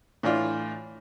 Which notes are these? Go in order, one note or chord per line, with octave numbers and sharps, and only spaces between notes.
A2 E3 D4 F4